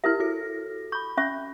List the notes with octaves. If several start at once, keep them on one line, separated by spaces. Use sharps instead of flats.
E4 G4 A#4 E5 F6
F#4 A4 A#6
B5 C#6 G6
C#4 E5 C#6